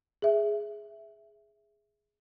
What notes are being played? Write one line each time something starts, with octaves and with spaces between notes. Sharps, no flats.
G#4 E5